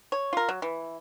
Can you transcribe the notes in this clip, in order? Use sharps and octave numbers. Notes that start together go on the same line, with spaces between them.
C#5
F4 A#4
F#3
E3